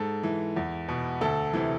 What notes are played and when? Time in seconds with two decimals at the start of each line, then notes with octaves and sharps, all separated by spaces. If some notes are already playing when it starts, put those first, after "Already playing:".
Already playing: G#2 A4
0.23 E3
0.56 E2
0.89 B2
1.21 D2 A4
1.53 C3 E3